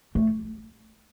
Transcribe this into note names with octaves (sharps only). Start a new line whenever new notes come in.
A3